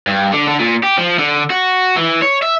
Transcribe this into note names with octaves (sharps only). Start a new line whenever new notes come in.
G2
D3
D3
A#2
G4
F3
D3
F#4
E3
C#5
E5